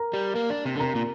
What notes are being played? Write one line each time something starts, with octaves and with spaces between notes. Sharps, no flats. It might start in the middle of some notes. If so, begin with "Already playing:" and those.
Already playing: A#4 A#5
G3
A#3
D4
C3
D3
C3 A#4 A#5
A#2